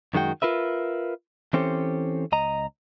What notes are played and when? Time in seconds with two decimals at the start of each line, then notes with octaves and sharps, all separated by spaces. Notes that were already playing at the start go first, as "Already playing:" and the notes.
0.14 F#2 D#3 G#3 F#4 G5
0.42 F4 A#4 B4 E5
1.53 E3 C4 C#4 G4 A4 C5
2.32 C#2 D#5 A#5